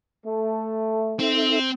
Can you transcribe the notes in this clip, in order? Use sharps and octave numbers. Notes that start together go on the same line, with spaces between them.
A3
C4 D#4 A4 E5